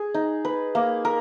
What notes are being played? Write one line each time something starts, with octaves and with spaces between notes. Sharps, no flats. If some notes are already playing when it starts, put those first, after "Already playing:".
Already playing: G#4
D#4
B4
A#3
A#4